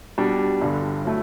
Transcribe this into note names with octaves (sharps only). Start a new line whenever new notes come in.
B2 G3 D4
G1 G2 D3
F#3 A3 E4